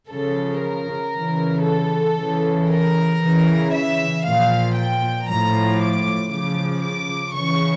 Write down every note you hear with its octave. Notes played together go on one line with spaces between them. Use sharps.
C#3 F3 A4
A#4
C#3 E3
A4
C#3 E3
A#4
C#3 E3
E5
A#2 F3 F5
G5
A2 F3 A#5
D6
C#3 F3 D6
D6
C#3 E3 C#6